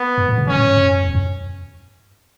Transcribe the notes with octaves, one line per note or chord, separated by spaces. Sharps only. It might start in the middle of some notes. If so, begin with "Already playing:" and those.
Already playing: B3
F#2
A2
C#3
D3 C#4
A2
G2
F#2
E2
F#2